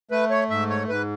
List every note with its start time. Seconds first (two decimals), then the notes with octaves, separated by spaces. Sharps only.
0.11 A3 B4
0.30 C#5
0.50 G#2 E5
0.70 C#5
0.89 G#2 B4